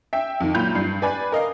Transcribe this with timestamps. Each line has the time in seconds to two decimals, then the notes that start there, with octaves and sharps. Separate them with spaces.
0.13 E5 G5
0.40 F2 D#3
0.54 A#2 F#3 F4 B5 G6 F7
0.75 G2 D4 C7
1.02 B4 D5 G#5 B5
1.32 A#4 D#5 F5